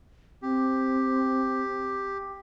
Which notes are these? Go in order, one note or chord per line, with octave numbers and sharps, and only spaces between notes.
C4 G4